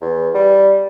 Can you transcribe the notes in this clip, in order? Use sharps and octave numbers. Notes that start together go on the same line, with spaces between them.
E2
G3